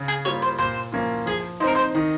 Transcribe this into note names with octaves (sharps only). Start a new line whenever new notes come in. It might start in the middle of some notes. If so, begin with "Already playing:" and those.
Already playing: C#3
G#4
G3 A#3 F4 C#5
C5
A#2 C5
F3 A#3 C#4 F4
F3 G#4
C4 D#4 A#4 C5
C5
D#3 D#5